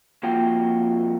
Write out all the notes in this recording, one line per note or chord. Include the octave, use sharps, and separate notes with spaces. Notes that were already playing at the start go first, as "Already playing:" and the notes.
F2 A#3 F4 F#4 G5